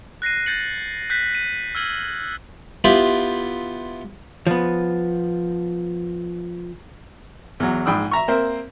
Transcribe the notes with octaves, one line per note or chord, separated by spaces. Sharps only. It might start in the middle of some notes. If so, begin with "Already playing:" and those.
F#6 A#6 C7 D#7
G6 A6 A#6 C#7 F#7
F#6 G6 B6
D#7
E6 F6 G#6 D#7 F#7
B3 E4 F4 G4 B5
F3 B3
E2 F#3
A#1 G#2 G5 B5 D#6 E6
E5 A#5 C#6
A#3 C4 A#4 C5 E5